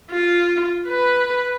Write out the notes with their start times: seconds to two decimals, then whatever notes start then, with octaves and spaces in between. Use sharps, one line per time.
0.10 F4
0.88 B4